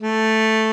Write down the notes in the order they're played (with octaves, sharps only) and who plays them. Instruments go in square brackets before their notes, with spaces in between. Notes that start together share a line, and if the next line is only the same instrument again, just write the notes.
[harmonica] A3